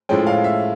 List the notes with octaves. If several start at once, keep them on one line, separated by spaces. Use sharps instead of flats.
A2 F3 G#3 C#4 G5
F5
E5